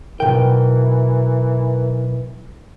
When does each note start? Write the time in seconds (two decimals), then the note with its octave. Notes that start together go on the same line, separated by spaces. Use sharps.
0.20 B1 A#2 E3 A#4 G5